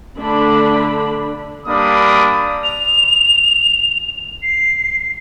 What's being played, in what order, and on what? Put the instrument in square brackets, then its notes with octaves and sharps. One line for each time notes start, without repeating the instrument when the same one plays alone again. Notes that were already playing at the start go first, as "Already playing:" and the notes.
[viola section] D3 A3 D4 B5
[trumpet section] G3 A#3 D4 B5 D#6
[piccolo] F7
C7